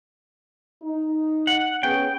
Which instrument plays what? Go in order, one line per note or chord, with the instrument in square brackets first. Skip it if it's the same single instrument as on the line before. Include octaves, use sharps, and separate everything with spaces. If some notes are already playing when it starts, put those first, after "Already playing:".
[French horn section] D#4
[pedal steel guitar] F#5
[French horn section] B3 C#4 G#4 [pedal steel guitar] G5